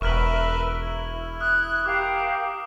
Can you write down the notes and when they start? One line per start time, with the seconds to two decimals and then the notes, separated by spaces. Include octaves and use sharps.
0.01 E1 A#4 B4 E5 C#6 F6 F#7
0.81 E4
1.40 D#6 F6 F#6
1.86 G4 A#4 F5 D6